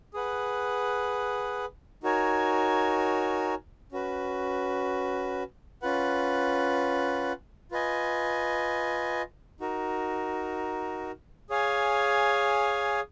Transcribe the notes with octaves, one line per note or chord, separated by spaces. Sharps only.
G#4 B4 F#5
D#4 F#4 A#4 C#5 G#5
C#4 F#4 B4
C#4 F4 B4 F#5
F4 B4 D#5 G#5
D#4 F#4 A#4
G#4 C#5 F5 G#5